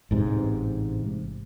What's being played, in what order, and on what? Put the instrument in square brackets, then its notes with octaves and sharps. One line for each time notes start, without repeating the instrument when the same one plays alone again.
[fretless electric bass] A1 G#2 C3